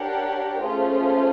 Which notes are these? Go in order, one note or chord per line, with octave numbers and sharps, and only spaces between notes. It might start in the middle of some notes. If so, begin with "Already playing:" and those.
Already playing: D4 G4 A#4 C#5 F#5
A3 C#4 F4 G#4 C5